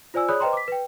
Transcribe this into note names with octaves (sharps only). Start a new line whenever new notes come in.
F4 C5 D5 G#5 E6
G#4 C#5 D5 B5 D#6 F#6
B4 C5 D#5 G5 A#5 C6
D6 B6
B4 G5